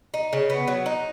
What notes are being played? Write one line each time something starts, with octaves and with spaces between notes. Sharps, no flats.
D#4
C#3
B3
F#3
D#4